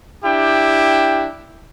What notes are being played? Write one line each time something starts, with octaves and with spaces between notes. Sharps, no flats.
D4 E4 G4 G5